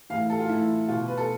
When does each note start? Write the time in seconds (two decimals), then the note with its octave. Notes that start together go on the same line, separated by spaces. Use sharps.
0.10 E3 F5
0.13 A2
0.30 A4
0.39 F4
0.49 A2 E3 E4
0.88 B2 F4
1.08 B4
1.17 A4